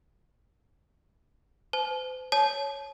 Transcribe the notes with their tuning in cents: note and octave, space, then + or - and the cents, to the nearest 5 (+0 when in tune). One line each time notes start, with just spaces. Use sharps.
C5 -40 A5 -45
C#5 +0 A5 -40